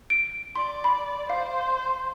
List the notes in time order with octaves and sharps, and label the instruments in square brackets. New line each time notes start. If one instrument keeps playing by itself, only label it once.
[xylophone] D7
[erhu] D5 [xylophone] C6
[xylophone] B5
[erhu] C5 [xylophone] F5